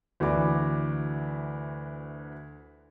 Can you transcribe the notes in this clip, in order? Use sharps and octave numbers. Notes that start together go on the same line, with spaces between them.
D2 E3 F#4 D5 B5 D6